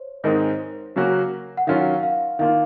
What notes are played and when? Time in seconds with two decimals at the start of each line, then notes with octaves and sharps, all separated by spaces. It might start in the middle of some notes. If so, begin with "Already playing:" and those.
Already playing: C5 C#5
0.24 G#2 D#3 G#3 C4 D#4 A#4
0.60 C5
0.96 C#3 F#3 A#3 C#4 F#4
1.57 F#5
1.67 D#3 F#3 C#4 F4 F5
2.03 F5
2.39 D#3 A#3 F4 F5